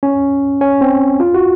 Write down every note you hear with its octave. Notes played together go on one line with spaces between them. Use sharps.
C#4
C#4
C4
F4
F#4